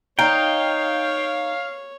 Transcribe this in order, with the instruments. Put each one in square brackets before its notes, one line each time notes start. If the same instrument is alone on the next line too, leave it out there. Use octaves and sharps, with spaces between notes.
[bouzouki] D#4 [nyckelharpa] C#5 [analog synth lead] F5 [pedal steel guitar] G5